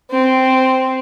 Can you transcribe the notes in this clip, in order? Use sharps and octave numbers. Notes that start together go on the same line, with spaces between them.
C4